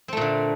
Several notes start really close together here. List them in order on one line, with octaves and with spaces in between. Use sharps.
C4 A3 A#2 D3